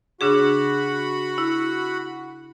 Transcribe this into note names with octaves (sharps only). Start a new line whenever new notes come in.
C#3 D4 F#4 G#4 F#5 B5
E4